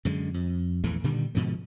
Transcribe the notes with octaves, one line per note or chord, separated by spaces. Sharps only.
F#2 D3 G#3
F2
A#1 E2 E3 A3
A#2 D3 D#3 G3
G#2 B2 D3 F3